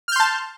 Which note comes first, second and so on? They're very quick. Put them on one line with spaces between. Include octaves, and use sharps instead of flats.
F6 G6 C6 A5